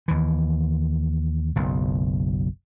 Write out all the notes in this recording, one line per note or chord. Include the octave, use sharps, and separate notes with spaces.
D#2 E3
F#1 B1